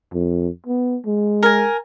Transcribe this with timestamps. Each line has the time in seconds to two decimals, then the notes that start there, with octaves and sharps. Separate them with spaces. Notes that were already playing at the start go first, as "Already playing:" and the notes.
0.14 F2
0.67 B3
1.06 G#3
1.43 A#4 G#5